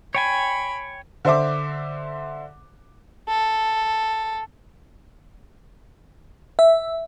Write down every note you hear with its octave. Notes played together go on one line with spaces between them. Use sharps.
C#5 G5 G#5 B5
D3 C5 E5 D6
A4
E5